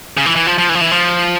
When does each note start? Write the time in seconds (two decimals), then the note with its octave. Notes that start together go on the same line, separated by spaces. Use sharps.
0.17 C#3
0.26 E3
0.36 E3
0.47 F3
0.58 F3
0.69 E3
0.75 F3
0.81 E3
0.92 F3